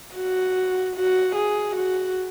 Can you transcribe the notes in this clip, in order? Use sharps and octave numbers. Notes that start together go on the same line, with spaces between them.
F#4
F#4
G#4
F#4